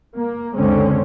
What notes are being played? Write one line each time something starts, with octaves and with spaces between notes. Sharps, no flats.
A#3
C#2 F#2 D3 G#3 C4 C#4